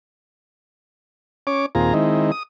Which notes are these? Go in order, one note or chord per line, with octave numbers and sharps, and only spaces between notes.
C#4 C#5 D6
D#2 A#2 C4 F4 G#4 A#5
D#3 G#3 C4 D#4 E4
D#6